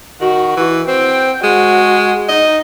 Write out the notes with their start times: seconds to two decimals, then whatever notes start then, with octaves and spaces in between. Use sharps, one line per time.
0.21 D#3 F#4
0.57 E3
0.88 C4 G5
1.44 G#3 F#4
2.29 D#4 D#5